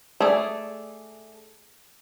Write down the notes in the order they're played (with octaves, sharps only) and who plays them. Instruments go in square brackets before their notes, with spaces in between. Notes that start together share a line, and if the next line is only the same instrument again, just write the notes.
[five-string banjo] A3 G#4 D5